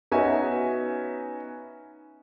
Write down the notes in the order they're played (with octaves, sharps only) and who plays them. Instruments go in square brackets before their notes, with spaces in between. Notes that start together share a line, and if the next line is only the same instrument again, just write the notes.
[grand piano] B3 C#4 D#4 F#4 E5 G#5